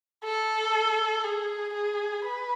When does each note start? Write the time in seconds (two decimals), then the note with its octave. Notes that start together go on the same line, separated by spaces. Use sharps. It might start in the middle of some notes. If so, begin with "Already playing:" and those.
0.24 A4
1.24 G#4
1.74 G#4
2.24 B4